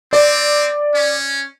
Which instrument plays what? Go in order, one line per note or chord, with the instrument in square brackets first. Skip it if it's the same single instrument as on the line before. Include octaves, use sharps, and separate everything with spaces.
[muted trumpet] C4 [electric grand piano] D5
[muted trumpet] C#4